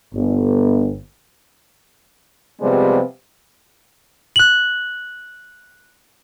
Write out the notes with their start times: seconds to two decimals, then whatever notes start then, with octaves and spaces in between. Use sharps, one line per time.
0.14 G1
2.61 C3 F3 G3 G#3 B3
4.36 F#6 F#7